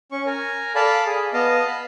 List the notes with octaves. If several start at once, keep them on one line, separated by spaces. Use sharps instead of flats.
C#4 C#6
A#4 G#5
A4 D5 F5 A5 B5
G#4
B3 D#5 F5 A5
B5